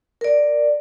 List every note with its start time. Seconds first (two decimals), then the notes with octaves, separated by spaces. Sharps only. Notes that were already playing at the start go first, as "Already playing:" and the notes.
0.21 A#4 D5